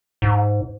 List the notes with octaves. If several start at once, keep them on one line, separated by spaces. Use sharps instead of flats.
G#2